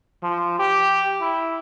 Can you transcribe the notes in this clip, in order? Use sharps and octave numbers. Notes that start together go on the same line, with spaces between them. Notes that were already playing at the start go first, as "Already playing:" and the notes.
F3
G4
E4